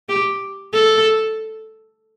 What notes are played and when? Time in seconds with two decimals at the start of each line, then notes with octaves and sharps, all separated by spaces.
0.09 G4
0.73 A4